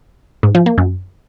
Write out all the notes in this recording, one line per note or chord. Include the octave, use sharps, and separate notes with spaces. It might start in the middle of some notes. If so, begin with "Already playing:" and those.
G#2
F3
A#3
F#2